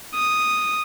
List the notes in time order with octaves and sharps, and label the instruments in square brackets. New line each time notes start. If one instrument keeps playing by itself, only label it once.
[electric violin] D#6